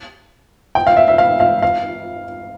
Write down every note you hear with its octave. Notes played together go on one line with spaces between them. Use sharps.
G5
F5
E5
E5
F5
F5
F5